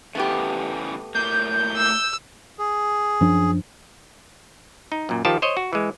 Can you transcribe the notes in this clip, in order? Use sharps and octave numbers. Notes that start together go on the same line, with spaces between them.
C#3 E3 G3 A3 B3 G4
A2 A#3 G6
E6
G#4
F#2 F3 D4
D#4
F#2 A#2
D#3 F3 F4 G4 A5
C5 C#5 D#5
F#4
E3 G#3